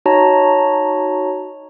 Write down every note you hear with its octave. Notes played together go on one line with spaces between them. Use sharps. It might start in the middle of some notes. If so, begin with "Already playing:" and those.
D#4 F#4 C#5 A5 A#5